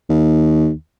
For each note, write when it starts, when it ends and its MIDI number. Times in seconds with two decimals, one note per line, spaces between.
0.09 0.71 39